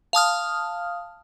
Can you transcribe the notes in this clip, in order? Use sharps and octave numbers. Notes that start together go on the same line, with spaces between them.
F5 A5 D#6 F6